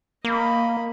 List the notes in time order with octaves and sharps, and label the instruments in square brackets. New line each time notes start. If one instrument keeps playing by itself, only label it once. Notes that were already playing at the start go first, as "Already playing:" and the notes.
[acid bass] A#3 [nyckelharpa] D#5 B5